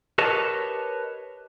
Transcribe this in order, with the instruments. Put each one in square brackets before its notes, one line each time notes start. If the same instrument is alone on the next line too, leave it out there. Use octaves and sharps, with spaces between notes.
[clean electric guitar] G4 A#4 B4 C#5 D#5 A5